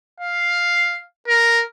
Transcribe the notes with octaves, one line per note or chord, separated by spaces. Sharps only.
F5
A#4